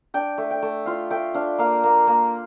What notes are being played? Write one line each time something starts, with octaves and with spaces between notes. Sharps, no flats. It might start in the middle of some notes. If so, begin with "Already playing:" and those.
D4 G5
A3
G5
A3
F4 F5
A3 G5
D4 F5
A#3 F5
A#3
A#3